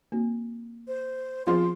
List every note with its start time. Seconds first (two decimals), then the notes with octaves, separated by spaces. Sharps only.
0.12 A#3 C4 F#4
0.88 C5
1.47 F3 B3 C4 F4 G#4 C5 C6